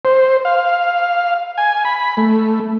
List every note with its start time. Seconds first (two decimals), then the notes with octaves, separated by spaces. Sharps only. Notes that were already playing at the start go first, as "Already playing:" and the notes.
0.05 C5
0.45 F5
1.58 G#5
1.85 B5
2.17 A3